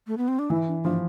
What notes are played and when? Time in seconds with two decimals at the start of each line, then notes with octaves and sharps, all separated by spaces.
0.07 A3
0.17 B3
0.28 C4
0.39 D4
0.50 E3 E4
0.68 D4
0.84 F3 D4